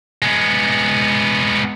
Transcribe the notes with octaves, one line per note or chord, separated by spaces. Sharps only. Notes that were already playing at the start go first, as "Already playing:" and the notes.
G#3 B3